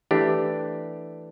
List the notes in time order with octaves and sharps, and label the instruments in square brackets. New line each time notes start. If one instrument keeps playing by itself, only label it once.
[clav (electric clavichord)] E3 A3 D4 G4